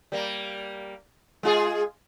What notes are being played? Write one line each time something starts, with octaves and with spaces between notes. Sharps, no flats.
G3 A#3
G#3 F4 G#4